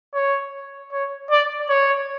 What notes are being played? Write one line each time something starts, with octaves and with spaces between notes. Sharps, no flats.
C#5
C#5
D5
C#5